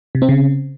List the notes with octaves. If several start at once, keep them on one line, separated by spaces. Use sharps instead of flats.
C3
C4
C#3